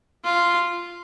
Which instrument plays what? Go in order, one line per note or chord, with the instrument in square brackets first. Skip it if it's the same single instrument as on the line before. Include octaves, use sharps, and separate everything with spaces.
[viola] F4